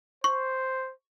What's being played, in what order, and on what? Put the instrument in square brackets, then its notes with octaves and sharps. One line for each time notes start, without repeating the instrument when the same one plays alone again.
[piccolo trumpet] C5 [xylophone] C#6